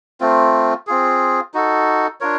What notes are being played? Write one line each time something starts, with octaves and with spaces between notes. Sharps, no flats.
A3 C4 F4
C4 F4 G#4
D#4 F#4 A4
D4 F4 A#4 C#5